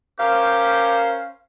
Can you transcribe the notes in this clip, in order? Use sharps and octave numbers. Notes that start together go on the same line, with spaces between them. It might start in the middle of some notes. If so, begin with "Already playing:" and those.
C#4 G4 A#4 C5 F5